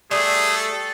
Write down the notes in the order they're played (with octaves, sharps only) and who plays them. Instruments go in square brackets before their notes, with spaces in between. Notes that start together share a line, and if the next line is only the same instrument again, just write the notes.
[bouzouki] G3 [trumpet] A3 [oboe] G#4
[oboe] A4